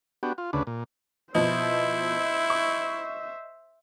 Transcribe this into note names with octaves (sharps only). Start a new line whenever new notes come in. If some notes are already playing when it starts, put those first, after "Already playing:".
B3 D4 F#4 G4
F4
D2 C#3 D4 B4
A#2
B2 F3 E4 C5 D#5 E5
C#6